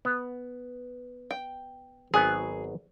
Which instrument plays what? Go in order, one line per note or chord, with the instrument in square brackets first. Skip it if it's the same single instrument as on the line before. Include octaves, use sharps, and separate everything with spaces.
[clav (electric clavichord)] B3
[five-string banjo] G5
[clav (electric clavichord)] G#1 F#3 B3 [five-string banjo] G#4